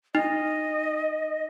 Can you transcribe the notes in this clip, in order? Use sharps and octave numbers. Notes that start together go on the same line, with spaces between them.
D#4 D#5